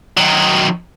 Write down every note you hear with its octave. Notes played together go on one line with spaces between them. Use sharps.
D#3 F#3